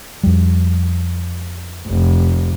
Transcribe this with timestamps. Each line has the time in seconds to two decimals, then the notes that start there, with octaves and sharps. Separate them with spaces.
0.24 F2 G3
1.87 F1